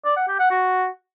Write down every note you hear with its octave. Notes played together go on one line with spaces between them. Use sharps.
D5
F#5
G4
F#5
F#4